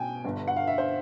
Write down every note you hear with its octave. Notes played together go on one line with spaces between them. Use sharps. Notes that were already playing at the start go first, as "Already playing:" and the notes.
Already playing: B1 B2 G5 G#5
G1 G2 D3
F#5
F5
E5
C5